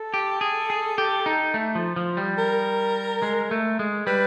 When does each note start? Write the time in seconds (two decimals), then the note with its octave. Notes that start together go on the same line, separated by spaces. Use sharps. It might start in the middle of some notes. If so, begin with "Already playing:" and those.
Already playing: A4
0.14 G4
0.41 G#4
0.70 G#4
0.98 G4
1.26 D#4
1.54 A3
1.75 F3
1.96 F3
2.17 G3
2.38 A#4
3.22 G#3
3.51 A3
3.79 G#3
4.07 G3 B4